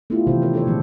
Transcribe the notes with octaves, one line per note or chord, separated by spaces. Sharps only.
A3 B3 D4 E4 F4 G4
C3 D#3 E3 C4 G4 C5
D4 G4 A#4 C#5
D4 A4 C5 C#5
A#2 D#3 F3 G#3 B3 C4